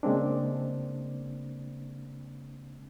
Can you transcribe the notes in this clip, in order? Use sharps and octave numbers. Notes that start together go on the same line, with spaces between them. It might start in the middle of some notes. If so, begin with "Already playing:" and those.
C#3 G#3 A#3 C4 D4